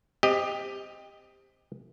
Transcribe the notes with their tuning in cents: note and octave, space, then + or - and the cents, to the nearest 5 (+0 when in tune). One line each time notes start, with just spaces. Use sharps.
C4 +0 G4 +20 D#5 +0